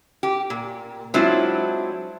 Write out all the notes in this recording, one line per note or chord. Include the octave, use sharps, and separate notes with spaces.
G4
A#2
F#3 G#3 C4 D4 E4 F4